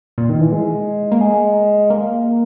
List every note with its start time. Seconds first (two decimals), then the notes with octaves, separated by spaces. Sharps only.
0.18 A#2
0.29 D#3
0.41 E3
0.52 G#3
1.12 A#3
1.21 G#3
1.90 A#3